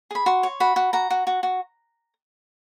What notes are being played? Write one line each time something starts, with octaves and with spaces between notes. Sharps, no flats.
G#4 B5
F#4 C6
C#5
F#4 B5
F#4
F#4 A#5
F#4
F#4
F#4